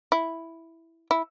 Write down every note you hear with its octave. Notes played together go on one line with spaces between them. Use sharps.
E4
E4